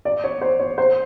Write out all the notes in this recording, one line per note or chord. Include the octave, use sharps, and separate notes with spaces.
D5
C#5
C5
C#5
C5